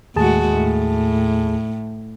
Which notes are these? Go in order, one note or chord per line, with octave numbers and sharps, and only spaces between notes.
D#2 A2 G#3 F#4 G#4 A5
A2